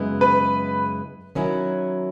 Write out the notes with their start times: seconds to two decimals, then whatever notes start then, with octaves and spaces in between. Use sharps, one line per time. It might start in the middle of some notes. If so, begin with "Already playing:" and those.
Already playing: F#2 C#3 G#3 B3 E4
0.21 B4
1.35 D#3 F#3 C#4 E4